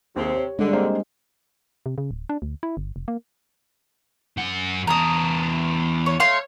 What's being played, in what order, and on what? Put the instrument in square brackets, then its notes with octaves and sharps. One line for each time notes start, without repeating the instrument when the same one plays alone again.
[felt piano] D#2 G#4 [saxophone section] C3 C4 [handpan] G4
[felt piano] C#5
[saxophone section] G2 D3 [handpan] G3 G#3 D4
[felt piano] A#3 C4 C5
[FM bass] C3
C#3
D1
D4
D2
E4
G1
F1
A#3
[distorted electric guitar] F#2 F#5
[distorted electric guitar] E2 A5 [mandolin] A#5 D#6
[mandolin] C#5
[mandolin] A3 F5 C6 [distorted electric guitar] C#5